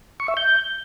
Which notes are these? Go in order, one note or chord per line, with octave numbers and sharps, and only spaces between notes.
C#6
E5
G6